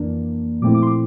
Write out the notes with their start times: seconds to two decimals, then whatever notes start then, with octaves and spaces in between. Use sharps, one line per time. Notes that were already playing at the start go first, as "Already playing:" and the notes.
Already playing: F2 E3 A#3 D4
0.61 A#2 F3 A3 C4 E4 D6
0.74 D6
0.82 C6
0.87 D6